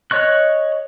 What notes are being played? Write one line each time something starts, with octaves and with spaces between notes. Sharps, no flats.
C#5 D#5 C#6 F#6